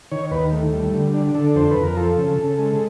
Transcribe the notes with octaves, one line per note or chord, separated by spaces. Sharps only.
D#3 C#5
D#2 B4
A3
G3
D3
D4
D3 A4
F2 C5
B4
F2
A#4
F3 A4
C#3
C#3
G#3